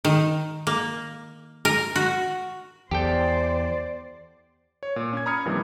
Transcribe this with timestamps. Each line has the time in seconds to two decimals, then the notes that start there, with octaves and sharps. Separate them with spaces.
0.05 D#3
0.67 A#3
1.65 A#4
1.96 F#4
2.91 E2 G4 A4 C5 D5 G5
4.83 C#5
4.96 A#2
5.13 C#4 G#6
5.26 A#5 B5 D#6 F6 G#6 C#7
5.45 F2 A#2 D#3 E3 G3